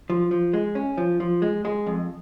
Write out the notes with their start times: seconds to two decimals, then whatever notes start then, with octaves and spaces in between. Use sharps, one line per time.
0.10 F3
0.31 F3
0.53 G#3
0.75 C#4
0.97 F3
1.20 F3
1.42 G#3
1.65 G#3
1.86 F2